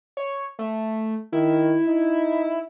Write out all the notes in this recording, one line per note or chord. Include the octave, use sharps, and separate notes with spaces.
C#5
A3
D#3 E4
D#4